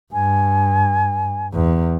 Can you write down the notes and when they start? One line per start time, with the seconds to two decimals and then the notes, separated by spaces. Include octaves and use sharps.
0.13 G2 G#5
1.54 E2